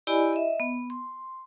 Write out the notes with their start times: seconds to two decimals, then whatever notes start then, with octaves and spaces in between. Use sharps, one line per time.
0.07 E4 G4 D5 D#5 G#5 B5
0.33 D#5 E5
0.60 B3
0.90 C6